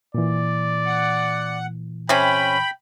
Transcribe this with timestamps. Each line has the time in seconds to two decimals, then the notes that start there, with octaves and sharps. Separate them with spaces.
0.14 A#2 E3 D5
0.86 F#5
2.09 C3 C#4 G5 B5